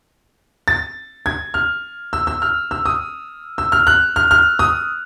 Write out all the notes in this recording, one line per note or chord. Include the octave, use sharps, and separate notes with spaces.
A6
G#6
F6
E6
E6
F6
E6
D#6
E6
F6
F#6
F6
F6
D#6